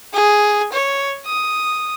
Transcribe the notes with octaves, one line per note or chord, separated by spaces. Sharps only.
G#4
C#5
D#6